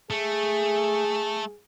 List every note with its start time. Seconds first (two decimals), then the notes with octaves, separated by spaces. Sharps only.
0.10 A3 G#4